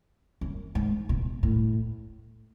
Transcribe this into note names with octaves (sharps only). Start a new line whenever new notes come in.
F#2
G#2
B2
A2